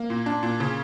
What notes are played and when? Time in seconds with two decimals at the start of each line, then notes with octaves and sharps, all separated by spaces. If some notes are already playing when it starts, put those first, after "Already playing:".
Already playing: A#3
0.10 A#2
0.26 D4
0.43 A#2
0.60 C#3